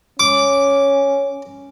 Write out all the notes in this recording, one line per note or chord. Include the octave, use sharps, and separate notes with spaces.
C#4 D6